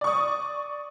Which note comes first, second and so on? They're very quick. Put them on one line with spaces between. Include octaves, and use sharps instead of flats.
D5 C#6 D#6